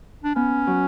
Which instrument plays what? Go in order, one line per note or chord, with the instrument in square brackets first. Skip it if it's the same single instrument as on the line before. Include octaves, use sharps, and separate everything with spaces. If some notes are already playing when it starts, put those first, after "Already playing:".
[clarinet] D4
[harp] B3 [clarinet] C#4
[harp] F#3